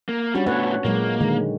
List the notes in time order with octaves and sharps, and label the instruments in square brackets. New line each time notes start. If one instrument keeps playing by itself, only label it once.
[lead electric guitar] A#3
[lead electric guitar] G3 [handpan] C#4 D4 F#4
[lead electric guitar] A2 B3 [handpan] B4 C#5 F#5
[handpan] A#2 F#3 G#3 [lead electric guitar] A#3
[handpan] D3 D#3 G#3